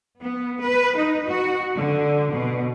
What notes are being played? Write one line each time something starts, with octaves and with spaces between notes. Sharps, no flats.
B3
B4
D#4
F#4
D3
B2